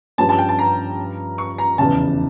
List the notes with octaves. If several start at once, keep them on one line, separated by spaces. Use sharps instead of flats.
G2 F3 C#4 A5
A5
G5
A5
A#5
C#6
A#5
F1 E2 C#3 E3 A5